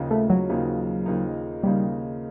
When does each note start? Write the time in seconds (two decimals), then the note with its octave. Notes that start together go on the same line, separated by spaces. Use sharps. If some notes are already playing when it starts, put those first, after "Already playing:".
Already playing: D#2 C#3 F3 A#3 D#4
0.11 A3
0.30 F#3
0.49 D#2 C#3 F3 A#3 D#4
1.06 D#2 C#3 F3 A#3 D#4
1.63 D#2 C#3 F3 G3 A#3 D#4